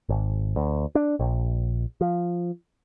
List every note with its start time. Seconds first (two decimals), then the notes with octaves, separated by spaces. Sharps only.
0.09 G#1
0.56 D2
0.95 D4
1.19 A#1
2.01 F3